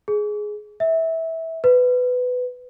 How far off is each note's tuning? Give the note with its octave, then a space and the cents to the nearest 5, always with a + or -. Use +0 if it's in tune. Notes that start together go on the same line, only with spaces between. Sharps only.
G#4 +10
E5 -20
B4 +15